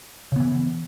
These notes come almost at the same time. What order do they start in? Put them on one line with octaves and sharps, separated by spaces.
C#3 B3 E3